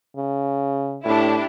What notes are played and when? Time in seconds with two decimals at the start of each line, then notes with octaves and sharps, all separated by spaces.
0.17 C#3
1.05 A2 D4 E4 G4